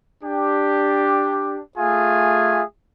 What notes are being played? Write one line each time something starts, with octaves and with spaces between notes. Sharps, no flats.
D4 G4
A3 F4 G#4 E5 G#5